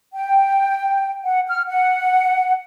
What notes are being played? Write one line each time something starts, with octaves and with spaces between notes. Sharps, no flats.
G5
F#5
F6
F#5